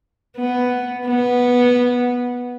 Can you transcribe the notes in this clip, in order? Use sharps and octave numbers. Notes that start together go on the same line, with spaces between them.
B3
B3